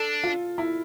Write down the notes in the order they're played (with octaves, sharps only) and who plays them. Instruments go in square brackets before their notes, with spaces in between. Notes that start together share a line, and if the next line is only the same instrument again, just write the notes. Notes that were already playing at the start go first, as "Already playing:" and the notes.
Already playing: [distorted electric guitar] D4 [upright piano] A4
[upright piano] F4
E4